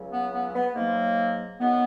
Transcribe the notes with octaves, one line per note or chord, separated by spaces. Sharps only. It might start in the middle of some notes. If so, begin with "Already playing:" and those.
Already playing: C#2 C#3 F#3
B3
B3
B3
G#2 F#3 A#3
F#2 D#3 F#3 B3